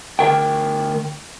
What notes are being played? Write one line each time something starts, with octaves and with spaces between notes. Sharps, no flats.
D2 A#4 G5